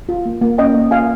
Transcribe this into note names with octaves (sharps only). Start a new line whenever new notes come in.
F4
A#3
A#3
C#4 D#5 G5
A#3
F4 F5 G#5